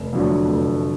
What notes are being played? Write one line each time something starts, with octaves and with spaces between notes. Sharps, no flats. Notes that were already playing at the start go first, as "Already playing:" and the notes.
Already playing: F1
F2 D3 F#3 A3
F1